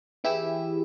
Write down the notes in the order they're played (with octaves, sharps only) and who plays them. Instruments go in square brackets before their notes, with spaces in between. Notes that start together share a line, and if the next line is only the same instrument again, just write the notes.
[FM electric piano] E3 E4 G4 G#4 E6